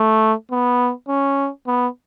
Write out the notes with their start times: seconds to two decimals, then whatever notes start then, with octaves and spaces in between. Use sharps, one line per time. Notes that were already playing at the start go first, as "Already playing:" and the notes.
Already playing: A3
0.51 B3
1.09 C#4
1.67 B3